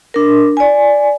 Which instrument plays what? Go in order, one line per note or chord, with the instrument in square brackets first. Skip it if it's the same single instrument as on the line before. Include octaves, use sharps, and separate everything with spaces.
[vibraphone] D4 A#4
D5 G#5